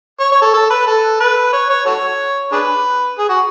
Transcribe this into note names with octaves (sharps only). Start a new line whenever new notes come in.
C#5
C#5
A4
A4
B4
A4
B4
C#5
C#5
F#4 A4 C#5
D4 G#4 B4
G#4
F#4